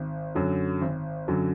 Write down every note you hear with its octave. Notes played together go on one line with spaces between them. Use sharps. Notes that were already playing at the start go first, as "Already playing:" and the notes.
Already playing: G#1
F#2 D3 F#3
G#1
F#2 D3 F#3